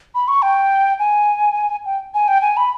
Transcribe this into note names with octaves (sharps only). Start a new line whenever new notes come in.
B5
C#6
G5
G#5
G5
G#5
G5
G#5
B5